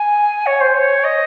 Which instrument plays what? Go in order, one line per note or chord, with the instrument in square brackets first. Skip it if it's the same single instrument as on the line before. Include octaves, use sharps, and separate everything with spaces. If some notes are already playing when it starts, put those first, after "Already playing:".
Already playing: [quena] G#5
C#5
C5
C#5
D#5